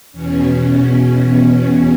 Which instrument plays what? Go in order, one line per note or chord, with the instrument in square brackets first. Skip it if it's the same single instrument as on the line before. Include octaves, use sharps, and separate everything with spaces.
[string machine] E2 B2 C#4